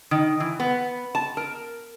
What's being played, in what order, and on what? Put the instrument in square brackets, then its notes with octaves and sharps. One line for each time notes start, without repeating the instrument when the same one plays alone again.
[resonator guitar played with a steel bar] D#3
E3
B3
A5
A#4